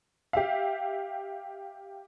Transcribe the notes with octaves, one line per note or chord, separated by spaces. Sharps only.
G4 E5 F5